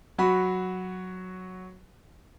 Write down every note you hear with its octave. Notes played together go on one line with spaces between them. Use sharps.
F#3 F#4 B5